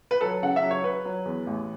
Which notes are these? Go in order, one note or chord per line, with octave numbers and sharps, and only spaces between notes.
B4
F#3 A4
C#3 F#5
E5
F#3
C#5
F#3 B4
F#3
E2
A1